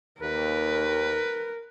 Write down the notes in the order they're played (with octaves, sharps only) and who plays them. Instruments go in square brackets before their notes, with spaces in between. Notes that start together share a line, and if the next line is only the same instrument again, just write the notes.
[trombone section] D#2 [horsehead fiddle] A#4 [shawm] B4